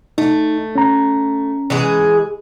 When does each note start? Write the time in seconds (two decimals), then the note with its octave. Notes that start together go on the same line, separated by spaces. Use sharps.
0.18 A3 D#4
0.75 C#4 A#5
1.70 E3 G#3 G#4